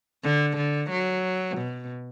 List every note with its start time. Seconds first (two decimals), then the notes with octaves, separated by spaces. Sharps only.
0.24 D3
0.57 D3
0.91 F#3
1.58 B2